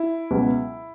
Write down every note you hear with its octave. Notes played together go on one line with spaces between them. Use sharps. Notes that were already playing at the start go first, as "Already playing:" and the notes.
Already playing: E4
C#2 B2 F#3